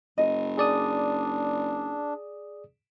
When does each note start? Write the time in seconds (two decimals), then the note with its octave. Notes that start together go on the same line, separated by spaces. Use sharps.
0.18 F#1 D#5
0.58 D4 G#4 D5 D#6